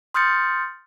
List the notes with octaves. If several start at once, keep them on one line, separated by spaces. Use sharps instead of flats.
C6 D#6 F6 G6 A6 C#7